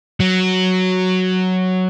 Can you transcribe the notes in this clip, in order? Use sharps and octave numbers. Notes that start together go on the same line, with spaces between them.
F#3